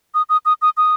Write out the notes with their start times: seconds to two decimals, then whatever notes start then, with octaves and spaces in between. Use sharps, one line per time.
0.14 D#6
0.29 D#6
0.45 D#6
0.62 D#6
0.77 D#6